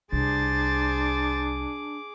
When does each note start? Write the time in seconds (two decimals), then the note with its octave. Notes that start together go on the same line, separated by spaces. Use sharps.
0.12 C2 D4 G#4 C5 D6 A6